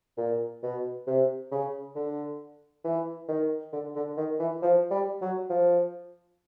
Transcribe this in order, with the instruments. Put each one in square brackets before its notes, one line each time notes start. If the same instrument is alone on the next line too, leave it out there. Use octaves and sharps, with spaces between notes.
[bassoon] A#2
B2
C3
C#3
D3
E3
D#3
D3
D3
D#3
E3
F3
G3
F#3
F3